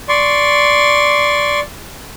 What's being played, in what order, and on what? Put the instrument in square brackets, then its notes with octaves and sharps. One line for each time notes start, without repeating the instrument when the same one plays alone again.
[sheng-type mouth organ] D5 C6 C#6